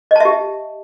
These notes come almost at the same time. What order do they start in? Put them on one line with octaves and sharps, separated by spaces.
D#5 A5 E5 G4